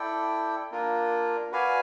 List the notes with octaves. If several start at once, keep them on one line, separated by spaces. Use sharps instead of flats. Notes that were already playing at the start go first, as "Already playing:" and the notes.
Already playing: E4 A4 D5 G5
A#3 D4 F4 A#4
F#4 B4 D5 F5 G#5